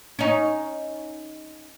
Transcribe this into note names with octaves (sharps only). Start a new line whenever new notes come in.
C#4 D#4